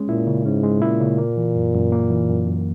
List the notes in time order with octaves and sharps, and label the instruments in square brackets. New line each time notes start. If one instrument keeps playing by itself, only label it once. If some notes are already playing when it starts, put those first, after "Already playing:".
Already playing: [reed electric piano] G#3 C#4
[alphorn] A#2 [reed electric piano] E4
[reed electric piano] C#3
[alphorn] G#2 [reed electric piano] C#4
[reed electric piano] G#3
[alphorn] A#2 [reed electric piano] E4
[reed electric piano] C#3
A#3
E3
F#2
F#2
A#3
E3
F#2
F#2